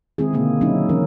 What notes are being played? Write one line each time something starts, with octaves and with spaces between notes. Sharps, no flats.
D#3 G#3 C4 E4 G#4
B2 D3 A#3 G#4
F#3 C#4 D#4 E4
E3 C#4 A#4